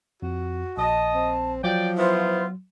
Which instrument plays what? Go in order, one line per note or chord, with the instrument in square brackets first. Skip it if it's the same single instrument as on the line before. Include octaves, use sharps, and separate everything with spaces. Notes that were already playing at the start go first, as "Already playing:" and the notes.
[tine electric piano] F2 [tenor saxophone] F#4
[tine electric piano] A#1 [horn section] D#5 [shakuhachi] A5
[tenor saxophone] C4
[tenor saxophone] F3 [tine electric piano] F#3 [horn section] D5 G5
[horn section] B3 E4 F4 [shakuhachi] C5